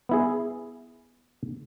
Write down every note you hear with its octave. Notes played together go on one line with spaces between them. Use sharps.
B3 E4 G#4